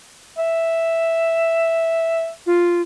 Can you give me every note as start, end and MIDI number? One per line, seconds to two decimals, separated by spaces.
0.38 2.31 76
2.46 2.82 65